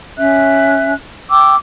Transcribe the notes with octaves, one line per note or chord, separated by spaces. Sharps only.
C#4 E5 F#6
G5 D6 E6